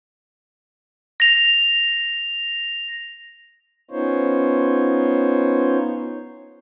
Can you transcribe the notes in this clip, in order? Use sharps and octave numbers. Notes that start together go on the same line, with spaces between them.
A#6 F7
B3 C#4 D#4 F4 C5 C#5